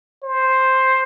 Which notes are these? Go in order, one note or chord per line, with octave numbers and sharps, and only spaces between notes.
C5